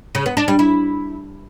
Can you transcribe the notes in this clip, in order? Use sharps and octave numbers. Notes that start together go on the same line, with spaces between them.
C#3
B3
D4
G3
E4